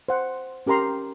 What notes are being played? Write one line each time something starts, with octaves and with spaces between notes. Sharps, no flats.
C5 F#5
C#4 G4 A#4 A#5 C6